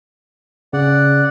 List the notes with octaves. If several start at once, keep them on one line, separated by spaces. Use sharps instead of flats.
C#3 D5 F#5